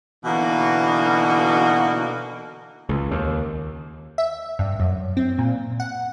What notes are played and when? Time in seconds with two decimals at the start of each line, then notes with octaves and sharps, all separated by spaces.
0.25 B2 D3 E3 A#3 D#4 F#4
2.89 C#2
3.12 D#2
4.18 E5
4.59 G2
4.80 F#2
5.17 C4
5.38 A#2
5.80 F#5